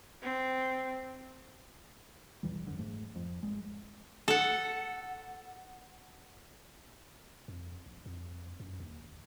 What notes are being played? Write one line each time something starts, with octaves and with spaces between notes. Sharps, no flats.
C4
B1 E2 E3 G3
G#1 F#2 D3
G#2 A3
F2
G#1 G#3
A4 F#5
F2
A#1
F2
F#2
D#2
G1